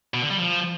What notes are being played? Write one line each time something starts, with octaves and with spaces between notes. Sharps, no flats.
B2
D3
G3
F3